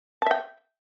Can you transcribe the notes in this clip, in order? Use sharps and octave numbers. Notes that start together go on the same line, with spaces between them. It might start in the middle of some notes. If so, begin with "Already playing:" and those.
E5 G5 A5